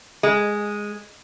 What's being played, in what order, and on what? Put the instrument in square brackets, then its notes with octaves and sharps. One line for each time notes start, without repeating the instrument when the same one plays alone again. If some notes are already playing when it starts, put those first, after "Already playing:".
[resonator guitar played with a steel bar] G#3